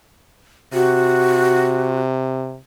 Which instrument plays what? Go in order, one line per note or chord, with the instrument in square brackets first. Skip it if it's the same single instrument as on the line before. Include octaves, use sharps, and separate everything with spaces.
[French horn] C3 [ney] F#4